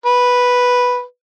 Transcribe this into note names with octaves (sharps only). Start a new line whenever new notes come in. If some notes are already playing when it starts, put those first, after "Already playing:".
B4